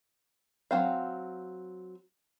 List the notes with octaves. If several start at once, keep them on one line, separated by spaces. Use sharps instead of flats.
F#3 C4 F5